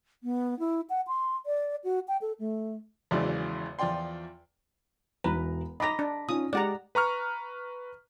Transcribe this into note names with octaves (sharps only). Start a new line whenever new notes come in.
B3
E4
F#5
C6
D5
F#4
G5
A4
A3
G#1 E2 C#3 E3 F#3 D5
E2 F3 F4 D5 G5 C6
E1 E4 B4 A#5
D#5 A#5 B5 D6 A#6
D4
C#4 D#4 F4 D#6
G#3 G4 D5 F#5 A#5
B4 A#5 C#6 F6